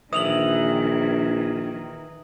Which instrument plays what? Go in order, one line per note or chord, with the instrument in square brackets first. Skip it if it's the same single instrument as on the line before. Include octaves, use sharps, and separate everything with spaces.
[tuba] A#1 [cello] D#3 [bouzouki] E3 [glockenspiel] D#6 F7 F#7